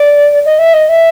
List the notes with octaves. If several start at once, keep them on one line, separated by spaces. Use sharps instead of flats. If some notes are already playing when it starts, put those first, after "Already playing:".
Already playing: D5
D#5
E5
D#5
E5